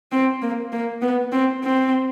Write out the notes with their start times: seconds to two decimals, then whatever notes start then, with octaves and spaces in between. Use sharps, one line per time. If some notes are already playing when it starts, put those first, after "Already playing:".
0.12 C4
0.42 A#3
0.72 A#3
1.02 B3
1.32 C4
1.64 C4